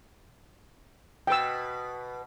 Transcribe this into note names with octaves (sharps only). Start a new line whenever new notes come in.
B2 B4 G5 E6